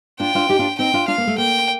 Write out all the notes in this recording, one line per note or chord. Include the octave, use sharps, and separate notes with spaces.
D4 F4 G5
D4 F4
D#4 G4
D4 F4
C4 D#4 G5
D4 F4
D4 F4 F5
A#3
A3
A#3 G5